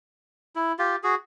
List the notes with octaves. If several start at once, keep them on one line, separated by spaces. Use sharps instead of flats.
E4
F4 G4
F#4 G#4